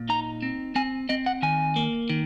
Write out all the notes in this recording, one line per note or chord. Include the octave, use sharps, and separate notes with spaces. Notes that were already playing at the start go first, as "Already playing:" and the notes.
Already playing: A#2
D#4 A#5
C4
C4 G#5
C4 D#5
F#5
D#3 G#5
A#3
D#3